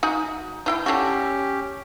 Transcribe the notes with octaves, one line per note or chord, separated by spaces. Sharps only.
D#4 F#4 G#5
D#4 E4 G5
D3 C#4 F#4 G4